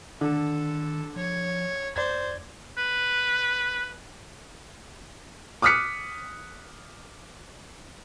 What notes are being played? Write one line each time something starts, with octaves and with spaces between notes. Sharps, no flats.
D3 D#3 A4
F3 C#5
F2 C5 D5 G#6
B4
D6 D#6 F6 F#6 B6 C#7